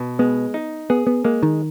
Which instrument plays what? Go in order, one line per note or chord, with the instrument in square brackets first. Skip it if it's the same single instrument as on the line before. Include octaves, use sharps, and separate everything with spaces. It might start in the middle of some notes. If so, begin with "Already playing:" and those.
Already playing: [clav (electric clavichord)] B2
[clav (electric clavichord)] G#3 [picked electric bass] B3
[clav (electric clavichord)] D#4
[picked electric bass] B3 [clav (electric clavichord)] G#4
[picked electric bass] B3
[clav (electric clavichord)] G#3 [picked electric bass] A#3
[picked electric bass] D#3